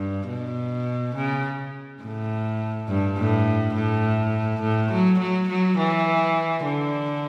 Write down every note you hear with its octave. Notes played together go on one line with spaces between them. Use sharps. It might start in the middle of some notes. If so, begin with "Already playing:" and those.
Already playing: G2
B2
C#3
A2
G2
A2
A2
A2
F#3
F#3
F#3
E3
D3